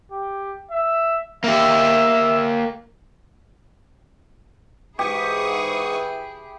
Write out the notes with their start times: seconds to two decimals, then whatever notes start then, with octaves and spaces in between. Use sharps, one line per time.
0.12 G4
0.71 E5
1.44 A#3 G4 E5
4.99 G#2 E3 E4 G4 G#4 C#6 D#6